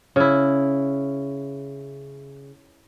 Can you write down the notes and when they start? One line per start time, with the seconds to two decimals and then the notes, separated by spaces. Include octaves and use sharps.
0.16 C#3 E4